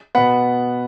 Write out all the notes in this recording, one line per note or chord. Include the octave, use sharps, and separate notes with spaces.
B2 B3 F#5 B5